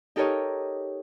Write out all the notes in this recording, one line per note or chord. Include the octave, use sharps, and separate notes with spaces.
D#4 G4 A4 A#4 C#5 D#5